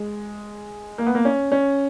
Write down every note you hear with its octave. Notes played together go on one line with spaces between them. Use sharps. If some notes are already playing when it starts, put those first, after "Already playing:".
Already playing: G#3
A#3
B3
A#3
C#4
C#4